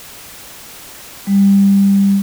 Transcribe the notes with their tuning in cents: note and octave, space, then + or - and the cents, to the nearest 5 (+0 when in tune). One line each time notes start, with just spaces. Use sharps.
G3 +15